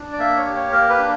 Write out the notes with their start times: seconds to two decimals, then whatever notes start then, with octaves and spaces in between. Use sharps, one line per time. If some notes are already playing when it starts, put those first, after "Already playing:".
Already playing: D4
0.12 D5
0.19 A#3 E5
0.37 C#5
0.45 G4
0.55 C#5
0.72 A#3 A#4
0.89 B4
0.98 D4